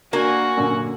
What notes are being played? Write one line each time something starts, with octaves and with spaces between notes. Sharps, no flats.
A#3 D4 F#4 G#5
F#2 A#2 D3